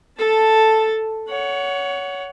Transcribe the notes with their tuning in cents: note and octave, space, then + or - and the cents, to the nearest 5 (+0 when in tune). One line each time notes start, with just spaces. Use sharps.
A4 +0 A5 +0
C#5 +25 F#5 +0